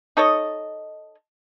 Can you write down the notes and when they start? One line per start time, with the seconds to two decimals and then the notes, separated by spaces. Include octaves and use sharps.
0.17 D#4 A4 C#5 D#5